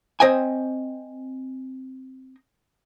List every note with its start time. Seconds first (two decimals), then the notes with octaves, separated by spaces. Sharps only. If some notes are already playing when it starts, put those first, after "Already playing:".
0.20 C4 C5 D#5 G5 G#5